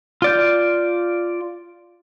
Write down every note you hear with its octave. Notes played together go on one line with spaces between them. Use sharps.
F4 D5 G6